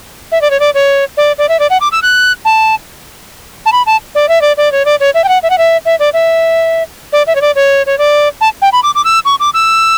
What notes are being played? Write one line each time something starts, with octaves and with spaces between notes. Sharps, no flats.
E5
D5
C#5
D5
C#5
D5
D5
E5
D5
F#5
D6
E6
F#6
A5
A5
B5
A5
D5
E5
D5
D5
C#5
D5
C#5
E5
G5
F#5
E5
F#5
E5
E5
D5
E5
D5
E5
C#5
D5
C#5
C#5
D5
A5
G5
B5
D6
D6
E6
C#6
D6
E6